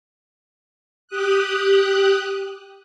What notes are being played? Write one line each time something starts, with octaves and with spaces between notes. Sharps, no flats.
G4 D#6 F#6